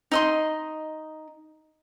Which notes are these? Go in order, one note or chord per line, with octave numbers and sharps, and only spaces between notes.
D#4 D#5 C6